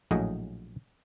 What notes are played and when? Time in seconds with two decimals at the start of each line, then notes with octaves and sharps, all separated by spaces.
0.11 A#1 A2 F#3 G#4 D#5